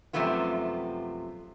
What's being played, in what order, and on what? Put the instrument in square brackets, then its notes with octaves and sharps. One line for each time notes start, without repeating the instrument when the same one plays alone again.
[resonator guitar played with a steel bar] F#2 C3 F3 A3 B3 F4